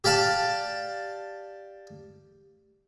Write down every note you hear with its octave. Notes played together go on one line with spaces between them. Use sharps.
G4 D5 F5 A5